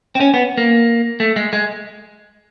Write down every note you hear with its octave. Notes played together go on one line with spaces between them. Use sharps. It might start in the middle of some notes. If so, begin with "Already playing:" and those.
C4
C#4
B3
A#3
A3
G#3
G#3